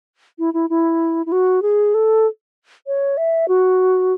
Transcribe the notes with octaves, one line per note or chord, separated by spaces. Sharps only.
E4
E4
E4
E4
F#4
G#4
A4
C#5
E5
F#4